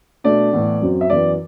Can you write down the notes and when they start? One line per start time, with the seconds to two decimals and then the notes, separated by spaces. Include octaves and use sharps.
0.24 B2 A3 D4 D5
0.53 A2 E3 B3
0.82 F#2 F#3 C4
1.01 E5
1.10 F#2 E3 B3 D5